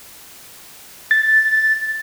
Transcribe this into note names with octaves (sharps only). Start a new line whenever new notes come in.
A6